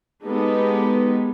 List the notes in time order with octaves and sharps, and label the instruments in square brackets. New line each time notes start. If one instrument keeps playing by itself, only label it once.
[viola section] G#3 B3 D#4 G4 A4